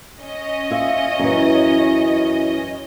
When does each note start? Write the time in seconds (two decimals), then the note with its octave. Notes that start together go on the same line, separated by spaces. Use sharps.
0.20 C#4 D#5
0.71 F4 E5
1.19 F#2 E3